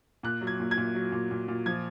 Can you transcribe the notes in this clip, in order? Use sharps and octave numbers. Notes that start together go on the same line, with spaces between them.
A#2 F#6
F#3
G#6
A#2
G#6
A#2
F#3
A#2
A#2
A#2
F3 G#6